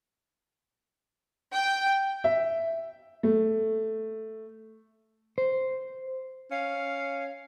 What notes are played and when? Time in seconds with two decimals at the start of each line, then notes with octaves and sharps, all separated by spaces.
1.52 G5
2.24 E5
3.23 A3
5.38 C5
6.51 C#4 F5